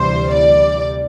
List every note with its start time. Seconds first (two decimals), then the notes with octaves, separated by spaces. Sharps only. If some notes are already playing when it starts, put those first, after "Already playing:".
Already playing: D2 C3 E3 G3 C5
0.35 D5